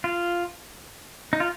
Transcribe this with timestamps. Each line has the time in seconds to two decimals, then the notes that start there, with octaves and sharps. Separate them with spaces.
0.04 F4
1.33 D#4
1.40 F4